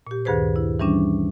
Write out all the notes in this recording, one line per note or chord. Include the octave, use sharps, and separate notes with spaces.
A#2 G4
D2 G2 D#3 G#4 B4 C5
E4
E3 G3 C#4 D4